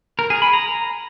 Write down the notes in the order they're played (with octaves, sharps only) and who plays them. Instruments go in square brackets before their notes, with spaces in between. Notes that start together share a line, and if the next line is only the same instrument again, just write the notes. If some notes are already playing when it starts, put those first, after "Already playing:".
[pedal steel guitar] A#4
G#4
B5
A#5